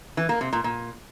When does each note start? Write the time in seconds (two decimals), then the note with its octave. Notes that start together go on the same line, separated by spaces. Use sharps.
0.17 E3
0.29 A#3
0.41 C3
0.53 A#2
0.64 A#2